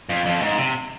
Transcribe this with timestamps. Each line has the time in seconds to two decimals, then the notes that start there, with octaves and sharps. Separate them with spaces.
0.09 F2
0.26 F2
0.42 G#2
0.58 C3